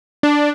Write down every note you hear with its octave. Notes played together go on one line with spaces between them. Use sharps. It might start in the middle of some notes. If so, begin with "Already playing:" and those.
D4